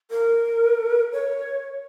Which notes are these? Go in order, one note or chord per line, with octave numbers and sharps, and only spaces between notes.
A#4
C#5